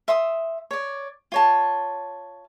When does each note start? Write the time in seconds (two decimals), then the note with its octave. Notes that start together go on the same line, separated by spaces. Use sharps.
0.08 E5 C6 D#6
0.71 C#5 D5
1.32 F4 C#5 A5